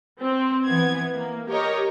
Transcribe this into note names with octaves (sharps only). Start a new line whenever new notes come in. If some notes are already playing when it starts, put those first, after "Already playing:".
C4
E3 B3 G#6
A#3
G4 A#4 C#5 D#5